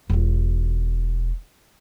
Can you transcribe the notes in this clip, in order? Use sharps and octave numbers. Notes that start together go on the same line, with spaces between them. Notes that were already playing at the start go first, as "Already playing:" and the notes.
E1 F4